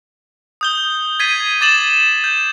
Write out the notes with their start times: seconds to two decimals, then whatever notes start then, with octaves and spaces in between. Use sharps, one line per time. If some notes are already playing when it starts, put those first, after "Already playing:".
0.61 D#6 G6 G7
1.20 G#6 A6 B6 C7 D#7
1.61 D6 A6 E7 F#7
2.24 G6